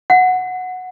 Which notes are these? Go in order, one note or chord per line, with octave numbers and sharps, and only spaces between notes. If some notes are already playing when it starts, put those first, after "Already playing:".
F#5